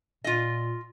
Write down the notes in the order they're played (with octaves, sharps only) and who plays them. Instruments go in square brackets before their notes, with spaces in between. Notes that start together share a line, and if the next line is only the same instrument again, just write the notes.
[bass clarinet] A#2 [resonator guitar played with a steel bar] F4 D#5